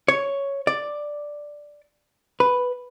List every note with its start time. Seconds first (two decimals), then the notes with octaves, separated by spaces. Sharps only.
0.08 C#5
0.67 D5
2.40 B4